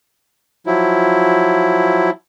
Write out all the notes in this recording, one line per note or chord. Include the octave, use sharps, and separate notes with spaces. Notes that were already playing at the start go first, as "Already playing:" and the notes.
F3 F#3 E4